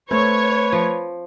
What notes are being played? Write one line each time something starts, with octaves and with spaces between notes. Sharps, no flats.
A3 C4 B4 C#5
F3